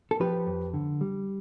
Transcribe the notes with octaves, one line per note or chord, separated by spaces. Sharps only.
A4
F3 G4 B4
F2
D3
G3